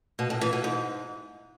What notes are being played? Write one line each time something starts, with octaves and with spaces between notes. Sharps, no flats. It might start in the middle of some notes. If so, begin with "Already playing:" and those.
B2
A2
E3
B2
G#2